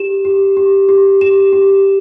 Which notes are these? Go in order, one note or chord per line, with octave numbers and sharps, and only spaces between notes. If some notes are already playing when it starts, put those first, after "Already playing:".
Already playing: G4 E7
G4
G4
G4
G4 E7
G4